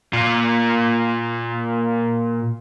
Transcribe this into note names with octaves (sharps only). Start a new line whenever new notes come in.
A#2 F4